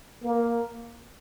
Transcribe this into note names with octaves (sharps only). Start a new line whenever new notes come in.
A#3